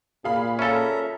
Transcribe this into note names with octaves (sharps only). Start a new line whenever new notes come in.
A#2 G#4 F5 B5
C#4 A4 E5 A#5